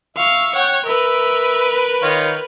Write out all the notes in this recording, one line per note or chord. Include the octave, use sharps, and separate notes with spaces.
E5 F5 C#6
C#5 F#5 G5
A#4 B4 E5
D#3 F4 C#5